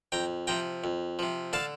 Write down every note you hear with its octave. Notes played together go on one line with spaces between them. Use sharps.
F2 G5 A#5
C3 F3 G5 A#5
F2
C3 F3
D3 F5 A5